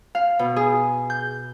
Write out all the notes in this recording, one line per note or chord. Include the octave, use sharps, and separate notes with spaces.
F5
B2
G#4
G6